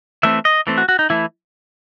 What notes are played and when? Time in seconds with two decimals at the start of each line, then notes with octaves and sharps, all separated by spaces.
0.23 E3 A3 C4 E5
0.45 D#5
0.67 E3 A3 C4
0.78 F#4
0.89 F#4
0.99 D#4
1.10 E3 A3 E4